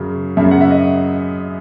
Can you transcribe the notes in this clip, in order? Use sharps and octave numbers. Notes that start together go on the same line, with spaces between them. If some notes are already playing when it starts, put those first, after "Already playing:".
Already playing: F#2 C#3 F#3
F#2 C#3 F#3 E5
F#5
E5
D#5